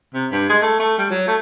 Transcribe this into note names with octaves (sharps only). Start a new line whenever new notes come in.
C3
G2
G#3
A3
A3
G3
F#3
A3